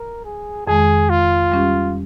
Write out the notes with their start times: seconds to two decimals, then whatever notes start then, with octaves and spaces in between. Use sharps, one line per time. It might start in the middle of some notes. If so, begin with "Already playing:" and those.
Already playing: A#4
0.25 G#4
0.67 F2 D#3 G#3 G#4
1.10 F4
1.52 G3 C#4 G4